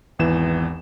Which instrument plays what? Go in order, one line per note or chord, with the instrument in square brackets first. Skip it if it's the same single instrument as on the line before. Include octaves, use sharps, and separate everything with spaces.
[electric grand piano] G#1 E2 E3 E7